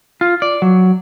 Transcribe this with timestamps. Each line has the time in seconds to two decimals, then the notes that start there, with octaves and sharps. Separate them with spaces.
0.21 F4
0.42 D5
0.62 F#3